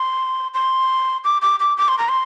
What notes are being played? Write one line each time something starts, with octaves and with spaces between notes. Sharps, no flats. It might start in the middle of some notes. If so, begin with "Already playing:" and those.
Already playing: C6
C6
D6
D6
D6
D6
C6
A#5
C6